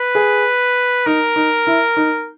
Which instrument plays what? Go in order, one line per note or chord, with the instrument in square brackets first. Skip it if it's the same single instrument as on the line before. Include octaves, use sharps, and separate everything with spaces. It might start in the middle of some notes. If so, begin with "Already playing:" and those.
Already playing: [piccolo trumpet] B4
[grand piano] G#4
[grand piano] D#4 [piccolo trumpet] A#4
[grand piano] D#4
E4
D#4